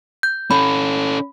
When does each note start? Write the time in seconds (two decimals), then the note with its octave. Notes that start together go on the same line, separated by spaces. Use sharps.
0.23 G6
0.51 C#4 A4 B5